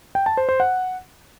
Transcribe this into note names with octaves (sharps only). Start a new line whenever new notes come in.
G5
A5
C5
C5
F#5